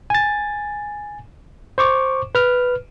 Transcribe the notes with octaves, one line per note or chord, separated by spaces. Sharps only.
G#5 A6
C5 C#6 D6
B4 F6